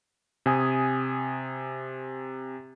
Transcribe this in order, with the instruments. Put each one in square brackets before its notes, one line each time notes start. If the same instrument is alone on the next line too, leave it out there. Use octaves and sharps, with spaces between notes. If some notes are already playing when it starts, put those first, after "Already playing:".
[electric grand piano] C3 G#5 D#6